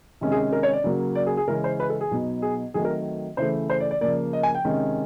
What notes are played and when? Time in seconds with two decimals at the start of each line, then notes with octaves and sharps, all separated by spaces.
0.21 C3 D#3 G#3 C#4
0.32 G#4
0.53 A#4
0.63 C#5
0.73 D5
0.84 C#3 F#3 A#3
1.15 D5
1.27 G#4
1.37 G#4
1.47 C#3 E3 G#3 C#4 A#4
1.64 C5
1.80 B4
1.90 A4
2.01 G#4
2.11 B2 F#3 B3 D#4
2.42 G#4
2.74 D#3 F#3 A3 C4 G#4
2.85 A#4
3.37 C#3 E3 A3 C5
3.70 C5
3.80 D5
3.91 D5
4.01 C#3 F3 A#3 D5
4.33 D#5
4.43 G#5
4.54 G5
4.65 C3 D#3 G#3 C#4